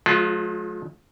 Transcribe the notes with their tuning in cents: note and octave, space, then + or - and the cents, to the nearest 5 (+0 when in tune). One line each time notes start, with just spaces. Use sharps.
F3 +40 G#3 +45 F4 +0